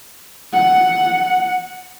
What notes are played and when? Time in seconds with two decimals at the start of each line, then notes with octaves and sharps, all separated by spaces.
0.53 F#5